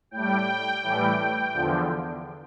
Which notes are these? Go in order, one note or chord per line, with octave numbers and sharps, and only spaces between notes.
A2 G3 G5
A2 E3 G3
E2 D3 F3